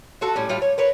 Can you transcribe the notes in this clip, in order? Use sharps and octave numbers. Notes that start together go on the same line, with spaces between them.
F4 F#4 A4
A2 G3 C#4
A2 G3 F4 F5
C#5
A#4 B4 C#5